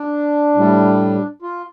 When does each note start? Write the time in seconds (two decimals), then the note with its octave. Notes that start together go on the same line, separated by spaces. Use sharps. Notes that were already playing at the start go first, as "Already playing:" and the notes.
Already playing: D4
0.55 A2 G3
1.42 F4